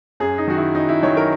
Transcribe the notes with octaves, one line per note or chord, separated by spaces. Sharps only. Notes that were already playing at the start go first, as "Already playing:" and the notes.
F#2 G#4
D#4
D#3 F#3 F#4
E4
F#2 D#4
E4
D#3 F#3 C#5
A#4